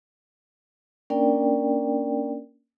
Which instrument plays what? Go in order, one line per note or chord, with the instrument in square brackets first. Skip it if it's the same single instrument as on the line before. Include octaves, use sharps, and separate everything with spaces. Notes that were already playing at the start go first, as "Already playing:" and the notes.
[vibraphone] A#3 C#4 D4 A#4 D5 G5